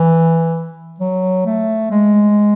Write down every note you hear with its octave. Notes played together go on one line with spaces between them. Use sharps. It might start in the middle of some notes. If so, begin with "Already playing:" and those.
Already playing: E3
F#3
A3
G#3